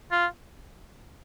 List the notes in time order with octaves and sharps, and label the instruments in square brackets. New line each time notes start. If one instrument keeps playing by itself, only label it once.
[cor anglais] F4